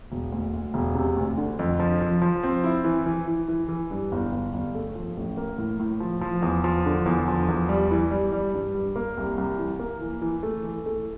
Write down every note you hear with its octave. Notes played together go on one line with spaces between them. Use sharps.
E1
D2
D2
E1
C3
D2
D3
F2
F3
F3
F3
C4
E4
E3
E3
E3
E3
E3
G2
G1
G1
G1
A3
F3
A1
A#3
A2
A2
F3
F3
E2
F3
D3
E2
F3
E2
G3
E3
G3
G3
G2
G3
A#3
C2
C2
E3
A#3
E3
E3
A3
E3
A3